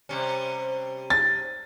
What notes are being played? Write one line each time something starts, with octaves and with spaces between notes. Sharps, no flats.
C3 G3 C#4
A6